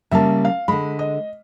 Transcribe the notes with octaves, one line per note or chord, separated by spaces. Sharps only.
C#3 G3 A#3 E5 A5
F5
D3 G#3 B5
D#5